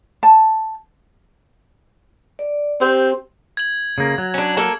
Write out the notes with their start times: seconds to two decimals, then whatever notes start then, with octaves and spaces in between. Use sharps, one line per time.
0.23 A5
2.39 D5
2.81 C4 G4
3.57 G#6 F#7
3.98 C#3 A#3
4.18 F#3
4.34 C#4 D4
4.57 A#3 A4